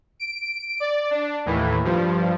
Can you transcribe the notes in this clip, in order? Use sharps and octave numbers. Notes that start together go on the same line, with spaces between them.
D7
D5
D4
D#2 A2 E3
G2 F3